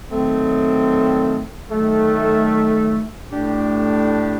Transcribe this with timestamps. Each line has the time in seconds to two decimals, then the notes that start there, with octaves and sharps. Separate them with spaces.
0.11 D#3 F#3 A3 C4
1.72 D#3 F#3 A3
3.31 A2 A3 D4 G4